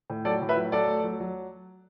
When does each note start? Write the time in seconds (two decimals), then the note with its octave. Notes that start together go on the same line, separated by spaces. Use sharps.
0.10 A2
0.25 F#3 A4 D5
0.42 A2
0.49 B4 E5
0.57 F#3
0.72 F#3 A4 D5
0.88 A3
1.04 F#3
1.20 F#3